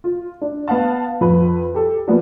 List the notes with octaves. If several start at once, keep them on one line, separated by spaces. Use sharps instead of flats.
F4
D4
B3 F5 F#5 A5
F2 B4
G4 A4
F3 G3 A#3 B3